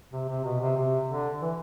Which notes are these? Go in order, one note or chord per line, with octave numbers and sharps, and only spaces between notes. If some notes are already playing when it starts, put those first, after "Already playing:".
C3
C3
B2
C3
C3
D3
E3